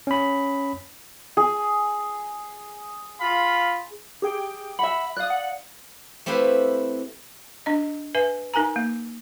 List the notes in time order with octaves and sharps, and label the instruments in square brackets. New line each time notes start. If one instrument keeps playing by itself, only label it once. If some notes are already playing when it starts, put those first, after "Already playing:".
[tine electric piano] C#4 B5
[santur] G#4
[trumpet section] F4 F5 B5
[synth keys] G4 G#4 G5
[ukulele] E5 F#5 [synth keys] B5
[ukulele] D5 F5 [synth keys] D#6 F#6
[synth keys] F#5
[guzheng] A3 C4 E4 G4 B4 F5
[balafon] D4 D#5
B4 E5 G#5
D#4 A#4 G#5 A#5
A#3